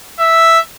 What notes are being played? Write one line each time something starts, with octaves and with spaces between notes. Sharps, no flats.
E5